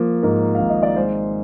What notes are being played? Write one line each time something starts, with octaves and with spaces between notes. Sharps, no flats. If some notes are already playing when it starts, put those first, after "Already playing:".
Already playing: F3 A#3
G#2 A#4
G#1 F5
D#5
D5
G#3 C5